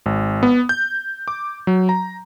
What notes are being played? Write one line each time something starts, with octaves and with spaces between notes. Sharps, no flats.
G#1
B3
G6
D6
F#3
A#5